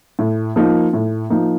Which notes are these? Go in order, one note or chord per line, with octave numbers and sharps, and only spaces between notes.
A2
F3 A#3 D#4
A2
F3 A#3 D#4